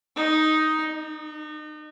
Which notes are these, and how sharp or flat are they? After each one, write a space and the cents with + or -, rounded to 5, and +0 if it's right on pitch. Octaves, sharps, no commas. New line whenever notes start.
D#4 +5
D#4 -35